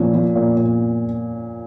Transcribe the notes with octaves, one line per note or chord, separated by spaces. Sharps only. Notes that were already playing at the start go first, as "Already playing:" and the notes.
Already playing: A#2 F3 C#4
F3
A#2
A#2